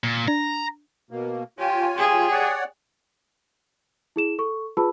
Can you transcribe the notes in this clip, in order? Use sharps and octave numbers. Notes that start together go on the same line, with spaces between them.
A#2
D4 A#5
B2 A#3
F4 G4 C#5 G#5
G4 G#4
C#5 D5 F#5
E4 G#4 E7
A4 C#6
F4 G#4 B4 A5 B5 E6